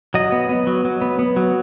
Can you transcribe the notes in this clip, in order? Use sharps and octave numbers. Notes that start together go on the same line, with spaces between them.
F#3 D#5
B3
B3
F#3
F#3
B3
B3
F#3